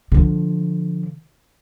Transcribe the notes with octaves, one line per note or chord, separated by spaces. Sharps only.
D3 F3